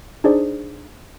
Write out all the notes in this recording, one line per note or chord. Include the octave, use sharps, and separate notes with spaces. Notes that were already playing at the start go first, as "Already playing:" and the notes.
D4 D#4 G#4 C5 D5